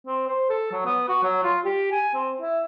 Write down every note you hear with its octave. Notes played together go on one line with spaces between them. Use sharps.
C4
C5
A4
F#3
B3
F#4
F#3
F4
G4
G#5
C4
E4